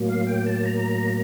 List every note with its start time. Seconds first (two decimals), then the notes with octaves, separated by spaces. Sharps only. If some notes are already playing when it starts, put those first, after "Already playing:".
Already playing: A2 F#3 A#3
0.08 F5
0.27 G5
0.46 A5
0.65 A#5